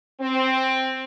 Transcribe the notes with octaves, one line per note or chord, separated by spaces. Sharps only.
C4